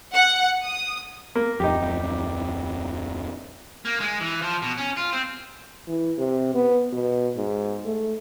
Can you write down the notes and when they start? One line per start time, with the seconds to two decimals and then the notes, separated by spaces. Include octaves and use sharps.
0.14 F#5
0.64 D#6
1.35 A#3
1.60 D1 F2 D#4 G4
3.85 A#3
4.00 G#3
4.21 E3
4.42 F3
4.62 B2
4.78 C#4
4.97 F4
5.13 C4
5.88 E3
6.18 C3
6.54 B3
6.92 B2
7.37 G#2
7.85 A3